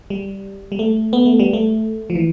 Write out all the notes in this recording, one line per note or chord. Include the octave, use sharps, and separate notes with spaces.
G3
G3
A3
B3
A3
G3
A3
F3
E3